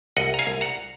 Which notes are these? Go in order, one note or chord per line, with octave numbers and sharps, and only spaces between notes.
C2 D#5 F#5
A#5
F5 G#5
C2
F#5 A#5